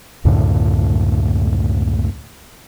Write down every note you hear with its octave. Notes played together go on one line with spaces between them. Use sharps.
C#2 F#2 A2 D3